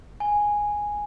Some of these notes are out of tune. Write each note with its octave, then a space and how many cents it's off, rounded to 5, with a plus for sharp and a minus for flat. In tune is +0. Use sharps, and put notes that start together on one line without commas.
G#5 -5